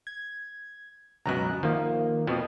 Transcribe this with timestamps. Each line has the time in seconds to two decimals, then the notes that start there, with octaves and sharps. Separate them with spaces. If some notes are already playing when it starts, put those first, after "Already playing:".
0.07 G#6
1.26 C#2 F#2 B2 A#5 F#6
1.63 D#3 F3 A#3
2.27 F2 B2 F3